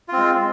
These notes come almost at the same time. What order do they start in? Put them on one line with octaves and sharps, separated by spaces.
F4 C4 G#3